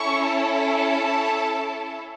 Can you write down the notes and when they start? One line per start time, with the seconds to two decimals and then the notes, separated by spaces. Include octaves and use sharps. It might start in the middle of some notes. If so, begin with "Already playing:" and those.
Already playing: C#4 E4 A4 C#6
0.25 A5